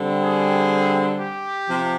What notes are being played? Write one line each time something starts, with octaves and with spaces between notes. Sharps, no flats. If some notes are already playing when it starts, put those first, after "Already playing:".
Already playing: D3 G3 C4
G#4
G4
C3 F3